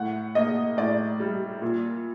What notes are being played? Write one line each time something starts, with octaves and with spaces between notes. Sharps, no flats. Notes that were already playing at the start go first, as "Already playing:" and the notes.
Already playing: A2 F#5
A#3 D#5
A2 D5
G3
A#2